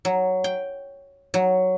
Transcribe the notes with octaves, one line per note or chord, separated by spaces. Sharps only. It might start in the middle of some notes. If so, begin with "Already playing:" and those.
F#3
G5
F#3